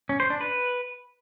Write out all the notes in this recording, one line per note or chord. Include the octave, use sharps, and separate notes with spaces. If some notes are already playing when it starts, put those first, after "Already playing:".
C#4
C5
D4
B4